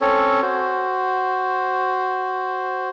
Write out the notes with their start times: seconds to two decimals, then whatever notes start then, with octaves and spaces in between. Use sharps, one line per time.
0.01 C4 C#4 A4 C#5
0.42 F#4 C5